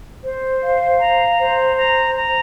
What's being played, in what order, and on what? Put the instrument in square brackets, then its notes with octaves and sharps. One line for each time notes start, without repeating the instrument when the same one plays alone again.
[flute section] C5
F5
A#5
C5
A#5
A#5